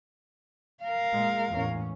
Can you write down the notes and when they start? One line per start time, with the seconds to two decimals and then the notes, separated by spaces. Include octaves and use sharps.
0.84 A#4 F5
1.13 A#2 G#3
1.51 E2 A2 C#4